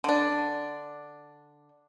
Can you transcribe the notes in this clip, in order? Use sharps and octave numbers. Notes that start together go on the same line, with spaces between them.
D3 D4